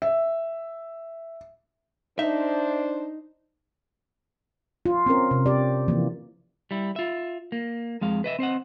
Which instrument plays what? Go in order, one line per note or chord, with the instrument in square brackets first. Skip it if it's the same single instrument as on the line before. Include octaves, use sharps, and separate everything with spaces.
[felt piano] E5
[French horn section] D4 C5 [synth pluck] D#4 [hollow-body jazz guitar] E5
[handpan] F4
C4 C#4 A#4
C3
G4 D5
E3 F3 A#3
[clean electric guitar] G3 E4
F4 E5
A#3
F2 G#3 F5
B4 D#5 E5
C4 C5 D#5 F#5